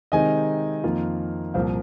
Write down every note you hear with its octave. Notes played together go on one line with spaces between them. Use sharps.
C3 D#3 G#3 C4 D#4 D#5 G#5
F2 D#3 A#3 F4
C2 A#2 F3 A#3 C5 F5